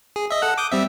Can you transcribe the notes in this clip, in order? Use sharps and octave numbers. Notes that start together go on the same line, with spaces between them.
G#4
D#5 E5
A4 F#5 F#6
D6 D#6 G6
G3 C4 E5